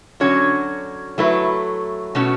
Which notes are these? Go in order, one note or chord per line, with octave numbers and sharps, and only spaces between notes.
D3 F#3 C#4 F#4 C#5
F#3 A3 E4 B4
B2 A3 C#4 F#4